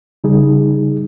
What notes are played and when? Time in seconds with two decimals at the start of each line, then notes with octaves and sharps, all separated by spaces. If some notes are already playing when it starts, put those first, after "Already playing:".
0.24 C#3 G3 D#4 G#4